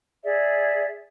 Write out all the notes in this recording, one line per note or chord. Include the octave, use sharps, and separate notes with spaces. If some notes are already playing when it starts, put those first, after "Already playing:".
G#4 D5 E5